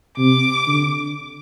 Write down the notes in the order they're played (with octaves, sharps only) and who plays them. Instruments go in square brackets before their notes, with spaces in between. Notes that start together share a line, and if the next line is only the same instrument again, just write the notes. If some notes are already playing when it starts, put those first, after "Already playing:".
[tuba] C3 [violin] D6
[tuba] D3